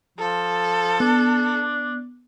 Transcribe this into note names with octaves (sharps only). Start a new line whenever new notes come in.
F3 A4
B3 D4